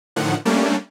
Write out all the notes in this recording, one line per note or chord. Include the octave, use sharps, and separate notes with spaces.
A2 D3 D#3 F3 F#5
G3 A3 A#3 C#4 D4